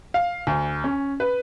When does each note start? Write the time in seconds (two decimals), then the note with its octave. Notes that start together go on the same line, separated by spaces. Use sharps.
0.14 F5
0.47 D2
0.84 C#4
1.20 B4